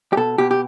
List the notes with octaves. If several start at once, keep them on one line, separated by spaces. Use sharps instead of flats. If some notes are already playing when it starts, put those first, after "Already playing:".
G4
B2 A4
B2 G4
G4